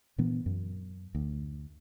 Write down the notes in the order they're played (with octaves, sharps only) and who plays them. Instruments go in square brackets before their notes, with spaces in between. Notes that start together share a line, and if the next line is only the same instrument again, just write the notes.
[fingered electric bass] A#2 E3 B3 D4
F#2
D2